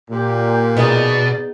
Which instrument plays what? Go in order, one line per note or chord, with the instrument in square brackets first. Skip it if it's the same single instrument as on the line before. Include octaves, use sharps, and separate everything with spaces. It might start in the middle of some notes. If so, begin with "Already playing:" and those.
[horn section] A#2 [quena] G4
[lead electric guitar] B2 [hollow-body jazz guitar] B3 D#4 G#4 [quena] D5